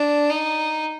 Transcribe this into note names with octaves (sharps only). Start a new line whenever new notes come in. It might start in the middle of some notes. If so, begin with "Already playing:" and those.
Already playing: D4
D#4